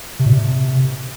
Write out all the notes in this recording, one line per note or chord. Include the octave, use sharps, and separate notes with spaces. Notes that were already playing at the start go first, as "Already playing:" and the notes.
C3
A#2
C3